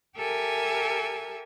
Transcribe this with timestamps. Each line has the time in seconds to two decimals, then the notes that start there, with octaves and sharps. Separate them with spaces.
0.16 G4 A4 A#4 E5 G#5